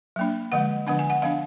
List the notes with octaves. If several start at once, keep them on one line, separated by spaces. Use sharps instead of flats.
F#3 A#3 D4
D3 F3 G#3 F#5
D3 F3 B3 D4 F#5
G#5
F#5
F3 B3 D4 F5